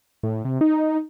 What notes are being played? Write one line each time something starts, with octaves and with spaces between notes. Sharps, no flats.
A2
C3
D#4